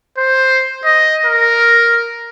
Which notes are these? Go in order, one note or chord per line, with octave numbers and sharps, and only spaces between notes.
C5
D#5
A#4